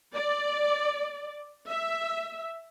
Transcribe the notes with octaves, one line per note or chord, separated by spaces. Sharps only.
D5
E5